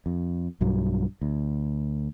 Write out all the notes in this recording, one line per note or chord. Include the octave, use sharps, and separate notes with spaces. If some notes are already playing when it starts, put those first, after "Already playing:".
F2
B1 G2 F#3
D2